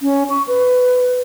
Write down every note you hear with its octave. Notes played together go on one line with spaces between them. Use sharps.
C#4
C#6
B4